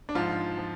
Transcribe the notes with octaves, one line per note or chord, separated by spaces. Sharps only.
D4
G#2 F3 F4
F3